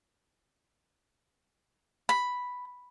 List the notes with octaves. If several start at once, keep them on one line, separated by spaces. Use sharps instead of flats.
B5